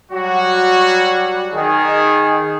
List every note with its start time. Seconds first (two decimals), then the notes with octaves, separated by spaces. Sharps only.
0.12 F#3 G3 F#4
1.52 D#3 G#4